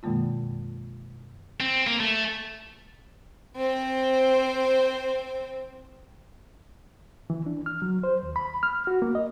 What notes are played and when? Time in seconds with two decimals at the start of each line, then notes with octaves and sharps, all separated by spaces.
0.03 F#2 B2 D#3 G#3 A#3 F4
1.60 C4
1.87 A#3
2.00 A3
3.57 C4 C5
7.30 E3
7.46 D4
7.66 F6
7.82 F#3
8.03 C5
8.23 D#2
8.36 B5
8.63 F6
8.87 F#4
9.02 A#3
9.15 D#5